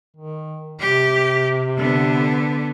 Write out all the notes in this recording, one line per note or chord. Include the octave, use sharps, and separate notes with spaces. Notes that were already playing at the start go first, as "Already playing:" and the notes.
D#3
C3 G4
D3 B3